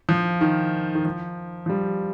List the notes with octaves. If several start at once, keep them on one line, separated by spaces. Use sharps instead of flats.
F3
D#3
D#3
F3
F3
G3